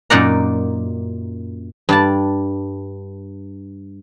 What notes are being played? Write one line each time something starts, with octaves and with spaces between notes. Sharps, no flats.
F#2 A#2 D#4 D5 F#5 A#5
G2 D5 A5